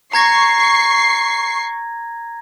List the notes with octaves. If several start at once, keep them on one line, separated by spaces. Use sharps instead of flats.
A#5 C#6 G#6 A#6 C7